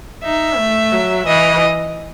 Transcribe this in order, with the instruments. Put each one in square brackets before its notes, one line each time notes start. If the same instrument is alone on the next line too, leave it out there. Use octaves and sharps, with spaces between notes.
[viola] D#4 [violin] E5
[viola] A3
F#3
[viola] E3 [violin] D#5